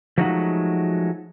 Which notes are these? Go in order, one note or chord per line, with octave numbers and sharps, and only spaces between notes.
F3 F#3 G#3 A3 D#4 F#4